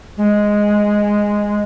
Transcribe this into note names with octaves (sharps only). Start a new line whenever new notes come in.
G#3